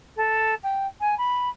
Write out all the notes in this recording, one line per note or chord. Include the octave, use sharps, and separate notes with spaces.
A4
G5
G#5
B5